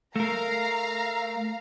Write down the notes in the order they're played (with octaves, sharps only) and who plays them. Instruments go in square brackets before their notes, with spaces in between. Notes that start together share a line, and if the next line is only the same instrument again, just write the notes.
[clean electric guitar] A3 A#4 [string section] F5 A#5